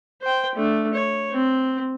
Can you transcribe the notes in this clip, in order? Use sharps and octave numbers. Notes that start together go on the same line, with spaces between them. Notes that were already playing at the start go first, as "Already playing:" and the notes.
C5 G5
A3 D4
C#5
C4